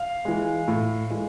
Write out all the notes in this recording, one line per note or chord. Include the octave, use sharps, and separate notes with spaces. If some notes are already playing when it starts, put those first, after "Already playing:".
Already playing: F5
E3 G#3
A2
E3 G#3